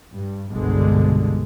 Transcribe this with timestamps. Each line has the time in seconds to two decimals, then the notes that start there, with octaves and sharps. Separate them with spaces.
0.15 G2
0.50 G1 C2 G2 B2 D3 G#3